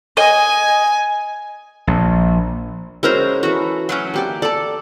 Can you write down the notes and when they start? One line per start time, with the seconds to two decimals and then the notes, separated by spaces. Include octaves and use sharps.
0.17 D#5 G#5
1.87 A#1
3.03 G#3 C#4 E4 F#4 A#4 C5
3.43 E3 F#4 A4 A#5
3.89 F#3 A3 C#4
4.14 A#3 G4 D5
4.42 A4 D5 A5